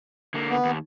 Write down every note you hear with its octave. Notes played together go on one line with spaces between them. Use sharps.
D3 A#3
B3
D#2